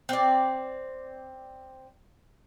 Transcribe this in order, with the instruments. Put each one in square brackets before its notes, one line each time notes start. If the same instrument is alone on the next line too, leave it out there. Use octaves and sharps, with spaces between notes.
[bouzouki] C4 D5